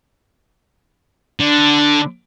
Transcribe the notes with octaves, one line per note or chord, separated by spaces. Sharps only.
D3